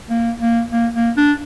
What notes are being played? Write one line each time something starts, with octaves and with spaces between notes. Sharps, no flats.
A#3
A#3
A#3
A#3
D4